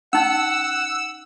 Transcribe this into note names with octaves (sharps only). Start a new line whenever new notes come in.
C#4 D#4 F#5 E6